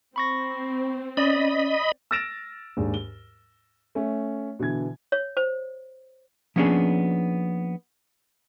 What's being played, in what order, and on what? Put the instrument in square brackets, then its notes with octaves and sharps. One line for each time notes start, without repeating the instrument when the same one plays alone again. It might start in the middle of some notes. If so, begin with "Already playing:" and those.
[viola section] C4 [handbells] B5 C#6 A#6
[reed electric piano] C#4 [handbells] D5 [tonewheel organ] D#5 B5
[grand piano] E6 F6 A6 A#6 D7 E7
D#2 G#2 D4 G#4
G7
A3 C#4
B2 D3 E3 G#6
[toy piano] C#5
C5
[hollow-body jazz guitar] F3 A#3 B3 C#4 D4 G#4